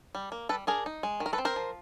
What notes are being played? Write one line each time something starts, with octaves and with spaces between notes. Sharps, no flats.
G3
A#3
G3 A4 B4
D4 G#4 A#4
D#4
G#3
D#3
A#4
A4 B4
C4
A#4 C5
F3